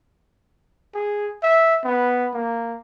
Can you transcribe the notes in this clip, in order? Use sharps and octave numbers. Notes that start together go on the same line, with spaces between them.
G#4
E5
B3
A#3